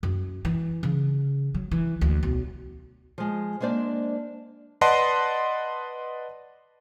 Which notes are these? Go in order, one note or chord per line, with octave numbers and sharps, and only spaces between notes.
F#2
E3
C#3
F#3
E3
D2
B1
F3 G#3
G#3 A#3 D4 C5 D5
B4 D5 D#5 F#5 A5 C6